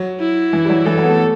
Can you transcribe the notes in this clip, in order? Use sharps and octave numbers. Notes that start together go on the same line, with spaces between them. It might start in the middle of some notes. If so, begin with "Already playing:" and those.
Already playing: F#3
E4
E3
G3
F#3
E3 A4
F#3
B3
A3